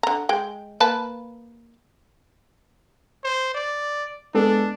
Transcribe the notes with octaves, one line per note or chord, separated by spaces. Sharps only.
D3 A#5
G#3 G5
A#3 B4 A5
C5
D5
G#3 B3 D4 A4